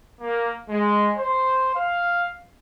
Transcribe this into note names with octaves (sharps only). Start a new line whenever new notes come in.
A#3
G#3
C5
F5